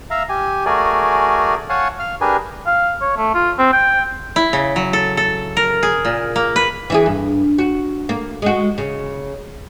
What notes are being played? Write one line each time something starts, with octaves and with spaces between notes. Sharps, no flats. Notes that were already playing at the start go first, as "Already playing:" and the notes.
E5 F5 A#5
G4 G#5
A3 F#4 G#4 A#4 D5 G#5
C#5 F5 F#5 G#5 A5
F5 F6
D4 G4 G#4 A#4 B4 G#5
F5
C#5
A3
F4
C4
G5
E4
C#3
F#3
A4
A4
A#4
G#4
A#2
A#3
B4
E3 E4 G#4
G2
F#4
A#3
G#3 F#4
C#3